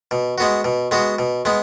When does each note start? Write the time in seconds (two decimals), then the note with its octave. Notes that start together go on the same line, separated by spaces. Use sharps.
0.11 B2
0.38 G#3 B3 F#4
0.64 B2
0.91 G#3 B3 F#4
1.19 B2
1.45 G#3 B3